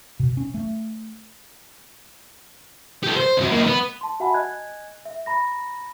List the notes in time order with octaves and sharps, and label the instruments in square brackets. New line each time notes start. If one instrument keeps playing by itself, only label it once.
[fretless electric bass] B2
C#4
A3
[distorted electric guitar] G4 A4
C5
F2 F#3
A#3 D#4
B3
[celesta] A5 C6
F#4 E5 F#5 G#5 A5 B5
D#5 G#5 F#6 G#6
E5
A#5 B5 A#6